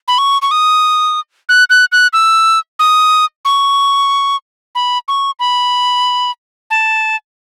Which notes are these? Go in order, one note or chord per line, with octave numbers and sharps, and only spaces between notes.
B5
C#6
C#6
D#6
F#6
F#6
F#6
E6
D#6
C#6
B5
C#6
B5
A5